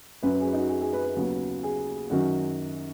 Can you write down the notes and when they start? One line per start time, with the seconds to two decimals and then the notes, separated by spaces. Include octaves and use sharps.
0.23 F#2 F#3 C#4 B4
0.34 B4
0.41 G#4
0.47 B4
0.53 D#4
0.58 F#4
0.69 G#4
0.81 G#4
0.93 B4
1.04 B4
1.16 D#2 C#3 F#3 B3
1.63 G#4
2.10 F#2 D#3 F#3 C#4 F#4